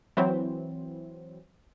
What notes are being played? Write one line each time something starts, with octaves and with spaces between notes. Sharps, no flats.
E3 F#3 C4